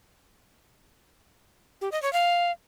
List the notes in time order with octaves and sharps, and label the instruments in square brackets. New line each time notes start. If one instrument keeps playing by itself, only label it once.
[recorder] G4
D#5
C#5
F5